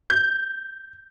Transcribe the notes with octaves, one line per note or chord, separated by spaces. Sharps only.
G6